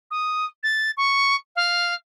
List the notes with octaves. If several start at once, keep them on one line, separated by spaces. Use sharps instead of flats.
D#6
A6
C#6
F5